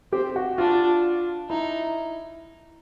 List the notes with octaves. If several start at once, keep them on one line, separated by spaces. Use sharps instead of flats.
C4 G4
F#4
D4 F4
D#4 E4